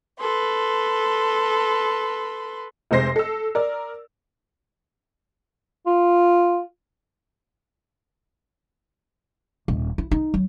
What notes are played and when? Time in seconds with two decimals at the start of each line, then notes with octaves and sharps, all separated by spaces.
0.18 A4 B4 C6
2.91 F1 C3 G#3 C5 A#6 C7
3.16 A4 E6
3.55 A#4 D5
5.87 F4
9.68 D#1
9.98 E4
10.11 D#4
10.34 F#3